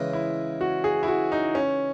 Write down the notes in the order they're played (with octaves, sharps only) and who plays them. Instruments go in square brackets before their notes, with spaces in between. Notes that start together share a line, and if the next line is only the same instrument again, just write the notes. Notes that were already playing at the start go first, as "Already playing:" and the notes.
Already playing: [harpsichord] C#3 E3 G#3
[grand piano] E4
F#4
G#4
E4
F#4
D#4
C#4